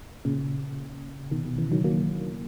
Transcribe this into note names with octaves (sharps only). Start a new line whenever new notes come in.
A#2 C#3
B2 D#3
B2 D#3
C#3 E3
D#3 F#3
F#3 A#3